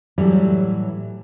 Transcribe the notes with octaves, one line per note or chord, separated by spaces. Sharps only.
A2 E3 F#3 G3 F#4